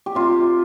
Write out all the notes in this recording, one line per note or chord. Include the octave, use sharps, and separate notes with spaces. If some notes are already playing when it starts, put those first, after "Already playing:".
G4
C3 F4